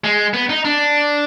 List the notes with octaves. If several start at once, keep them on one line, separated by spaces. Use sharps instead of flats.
G#3
B3
D#4
D4